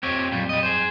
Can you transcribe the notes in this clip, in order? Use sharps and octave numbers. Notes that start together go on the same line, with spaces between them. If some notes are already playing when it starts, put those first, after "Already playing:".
F2 C4 G4 C#5 A6
A#2 F#3 G3 C4
G3 D#5
G#4 C5